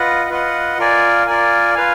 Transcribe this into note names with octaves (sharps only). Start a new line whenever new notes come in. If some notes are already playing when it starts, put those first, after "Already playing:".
Already playing: F4 B4 D#5 F#5
F4 B4 D#5 F#5
F4 A#4 D5 G#5
F4 A#4 D5 G#5
F4 B4 F5 G#5